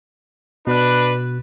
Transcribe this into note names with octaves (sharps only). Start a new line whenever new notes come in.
B2 D4 B4 F#6